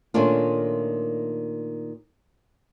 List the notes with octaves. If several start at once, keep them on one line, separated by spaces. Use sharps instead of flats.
A#2 D#3 A3 C#4 D4 F4